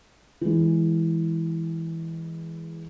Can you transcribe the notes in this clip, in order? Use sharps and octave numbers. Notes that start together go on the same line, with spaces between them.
E3 G#3